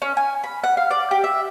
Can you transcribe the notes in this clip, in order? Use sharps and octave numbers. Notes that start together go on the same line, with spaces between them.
C#4
G#5
B5
F#5
F5
D5
G4
E5